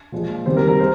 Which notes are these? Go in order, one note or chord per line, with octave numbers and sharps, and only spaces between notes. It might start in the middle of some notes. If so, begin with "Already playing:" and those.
A#2 F3 G#3
C3 D#3 G3 C5
A#4
A#4
G#3 C5